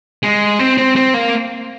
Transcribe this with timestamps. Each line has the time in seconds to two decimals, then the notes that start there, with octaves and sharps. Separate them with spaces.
0.23 G#3
0.59 C4
0.78 C4
0.96 C4
1.14 A#3